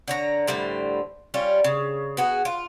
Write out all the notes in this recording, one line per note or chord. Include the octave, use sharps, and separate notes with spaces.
D3 C#5 A#5
A2 D3 G3 C5
G3 C#4 F4
C#3
B3 F#4 G#4
F4